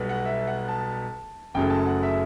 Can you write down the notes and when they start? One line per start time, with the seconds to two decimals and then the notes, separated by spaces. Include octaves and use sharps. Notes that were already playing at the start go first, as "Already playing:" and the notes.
Already playing: B1 B2 G3 B3
0.09 F#5
0.25 E5
0.47 F#5
0.68 A5
1.54 F#1 F#2 C#3 F#3 A3 G5
1.70 A5
1.86 F#5
2.03 E5